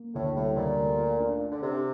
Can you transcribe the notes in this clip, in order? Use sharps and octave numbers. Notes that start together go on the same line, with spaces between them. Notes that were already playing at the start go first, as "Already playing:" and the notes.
Already playing: A#3
D2 A2
A2 G3
D2 A#2
A3
F4
D4
D4
D3
C3 D4